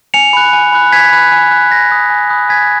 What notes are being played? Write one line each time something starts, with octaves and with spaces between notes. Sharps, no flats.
G#5 C#7 F7
B5 F#6
G#5
B5 F#6
G#5 G#6 B6
B5 F#6
G#5
B5 F#6
G#5 A#6
B5 D#6 F#6
G#5
B5 D#6 F#6
G#5 G#6 B6